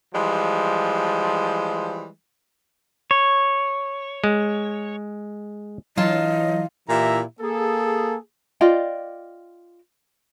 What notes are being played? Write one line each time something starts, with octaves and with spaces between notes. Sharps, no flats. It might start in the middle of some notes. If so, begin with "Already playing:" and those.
E3 F3 G3 G#3
C#5
G#3
E3 F#3 F4 D#5 A5
A#2 E3 E4 G4 E5 A#5
A#3 G#4 A4
F4 D5 D#5 G5